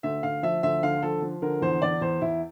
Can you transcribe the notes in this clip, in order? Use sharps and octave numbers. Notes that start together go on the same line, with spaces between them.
D2 E5
D2 F5
F3 E5
D2 E5
D3 F5
F3 A4
F3
D3 A#4
E2 C5
E2 D5
E2 C5
E2 E4